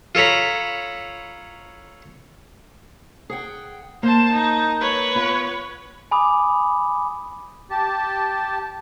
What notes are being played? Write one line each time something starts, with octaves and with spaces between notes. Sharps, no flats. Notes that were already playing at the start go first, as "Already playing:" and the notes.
F4 A4 C#5 A#5 B5
G#4 F#5 G5
A#3 C5 A5
D#4
B4 C#5
B3 F4
G#5 B5 D6 D#6
G4 A5